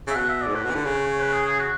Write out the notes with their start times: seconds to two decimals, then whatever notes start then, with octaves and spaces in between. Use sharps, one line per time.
0.08 C#3 E5
0.16 B2 F#5
0.29 E5
0.42 D5
0.47 G#2
0.55 A2 B4
0.64 B2
0.71 E3
0.75 D3
0.85 C#3
0.94 C#5
1.07 C#5
1.20 B4
1.33 G#4
1.46 G#4
1.59 F#4